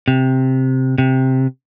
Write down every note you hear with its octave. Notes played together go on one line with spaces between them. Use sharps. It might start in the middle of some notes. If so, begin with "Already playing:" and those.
C3
C3